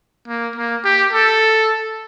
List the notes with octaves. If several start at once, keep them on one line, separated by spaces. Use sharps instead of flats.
A#3
A#3
G4
A4